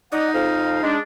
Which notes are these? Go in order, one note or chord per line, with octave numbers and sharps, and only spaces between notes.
D#4 D5 D#5 F#5
F2 F5
G#3 D4